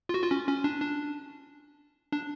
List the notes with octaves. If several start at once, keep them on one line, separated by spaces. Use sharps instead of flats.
F4
F#4
F4
C#4
C#4
D4
D4
D4